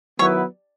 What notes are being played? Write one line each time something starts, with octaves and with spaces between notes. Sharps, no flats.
D#3 F#3 B3 E4 B4 C#5